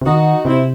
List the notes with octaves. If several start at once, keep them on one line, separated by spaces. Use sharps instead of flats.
C3
D#3 D#4 F#4
C3 C4 E4